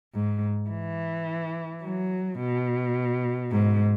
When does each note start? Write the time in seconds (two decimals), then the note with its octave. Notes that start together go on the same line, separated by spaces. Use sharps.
0.14 G#2
0.70 E3
1.83 F#3
2.40 B2
3.52 G#2